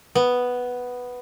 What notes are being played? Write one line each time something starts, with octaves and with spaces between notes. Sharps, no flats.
B3